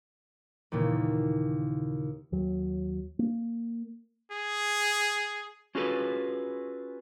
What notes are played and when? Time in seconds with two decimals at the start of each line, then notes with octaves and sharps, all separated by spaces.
0.72 D#2 A#2 C#3 E3
2.32 D#2 F#3
3.19 A#3
4.32 G#4
5.75 C#4 F4 F#4 G#4 A4 B4